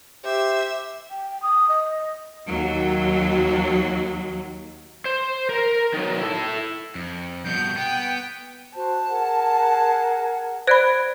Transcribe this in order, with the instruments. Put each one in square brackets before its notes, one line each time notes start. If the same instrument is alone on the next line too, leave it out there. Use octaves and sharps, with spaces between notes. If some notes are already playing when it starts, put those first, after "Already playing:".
[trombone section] G4 [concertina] C5 [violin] E5
[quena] G5
D#6
D#5
[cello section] D#2 F#3
[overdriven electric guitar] C5
A#4 A#5
D#3 F#3
E4 A4
F2
[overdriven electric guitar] G2 B2 [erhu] G6
[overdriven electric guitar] B3 [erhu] G5
[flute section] F#4 C5 [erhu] A5
[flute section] G#4 A#4 F#5
[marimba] C5 D5 B5 [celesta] F#6 G#6 D7